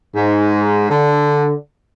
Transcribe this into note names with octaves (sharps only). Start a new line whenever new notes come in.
G#2
D3